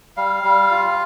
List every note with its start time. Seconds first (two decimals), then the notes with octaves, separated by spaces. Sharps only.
0.17 G3 F5
0.44 G3
0.71 F4